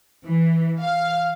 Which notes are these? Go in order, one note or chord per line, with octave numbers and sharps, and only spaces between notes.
E3
F5